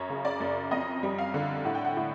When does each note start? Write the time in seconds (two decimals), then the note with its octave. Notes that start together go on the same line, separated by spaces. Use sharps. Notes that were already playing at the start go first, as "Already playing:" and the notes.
Already playing: F#2 C#5
0.09 C#3
0.25 D5
0.40 F#2
0.71 F2 D#5
1.03 G3
1.18 F5
1.34 D3
1.65 A2 F#5
1.75 G5
1.85 F#5
1.97 A2